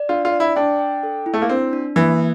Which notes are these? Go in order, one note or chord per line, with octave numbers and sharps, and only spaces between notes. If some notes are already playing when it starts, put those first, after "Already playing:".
Already playing: D5
D4 F4
F4
D5
E4
D4 G5
G5
A4
E4
A3
A#3
C4 D4
D4
E3 A#3